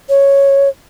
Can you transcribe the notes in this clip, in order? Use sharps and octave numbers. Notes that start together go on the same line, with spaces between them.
C#5